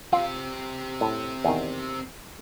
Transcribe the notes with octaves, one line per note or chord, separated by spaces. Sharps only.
C4 F4 G4
A2
E2 D#3